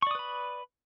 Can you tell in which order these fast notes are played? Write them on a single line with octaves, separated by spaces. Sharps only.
C#6 D5 D#6 B4 B5